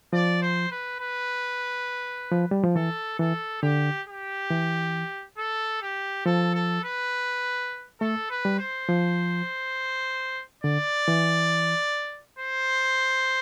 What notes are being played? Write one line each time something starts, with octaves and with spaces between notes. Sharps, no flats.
F3 D5
C5
B4
B4
F3
G3
F3
E3 A4
E3 A4
D3 G4
G4
E3
A4
G4
F3 A4
A4
B4
A3 A4
B4
G3
C5
F3
D3 D5
E3
C5